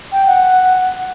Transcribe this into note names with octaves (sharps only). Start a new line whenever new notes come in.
G5
F#5